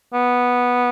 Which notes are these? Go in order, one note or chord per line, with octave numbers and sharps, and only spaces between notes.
B3